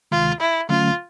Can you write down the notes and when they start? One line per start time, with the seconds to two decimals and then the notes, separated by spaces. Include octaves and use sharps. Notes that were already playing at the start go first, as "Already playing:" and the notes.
0.12 D2 C3 D#3 G#3 F4
0.40 E4
0.69 D3 F#3 A3 C#4 F4